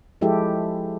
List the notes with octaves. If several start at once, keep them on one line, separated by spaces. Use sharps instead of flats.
F3 G#3 E4 G4 A4